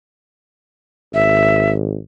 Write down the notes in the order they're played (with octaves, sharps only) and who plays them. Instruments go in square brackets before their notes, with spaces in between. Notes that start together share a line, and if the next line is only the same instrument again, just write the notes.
[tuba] G#1 [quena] E5